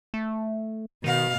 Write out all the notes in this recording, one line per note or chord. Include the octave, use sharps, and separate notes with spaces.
A3
B2 D#3 F5